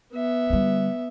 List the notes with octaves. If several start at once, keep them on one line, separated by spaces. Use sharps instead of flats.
B3 E5
D3 G3